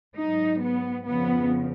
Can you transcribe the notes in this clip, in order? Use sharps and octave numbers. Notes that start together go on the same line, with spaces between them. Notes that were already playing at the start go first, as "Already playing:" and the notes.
G#2 F#3 D#4
B3
F2 C#3 F3 B3